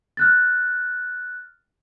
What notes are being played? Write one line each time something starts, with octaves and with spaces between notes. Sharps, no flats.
F6 F#6 A6